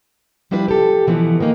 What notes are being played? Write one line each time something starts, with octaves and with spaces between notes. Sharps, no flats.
F3 G3 D4 E4 B4
G4 A4
B2 E3 F3 B3
D#3 E3 A#3 D#4